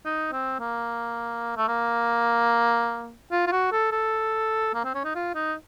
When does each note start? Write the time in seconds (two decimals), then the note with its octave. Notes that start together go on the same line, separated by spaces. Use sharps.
0.05 D#4
0.32 C4
0.59 A#3
1.57 A3
1.68 A#3
3.31 F4
3.47 F4
3.52 F#4
3.72 A4
3.92 A4
4.74 A#3
4.84 C4
4.94 C#4
5.04 D#4
5.15 F4
5.35 D#4